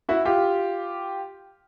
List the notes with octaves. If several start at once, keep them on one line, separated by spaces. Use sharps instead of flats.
E4 F#4
F4 G4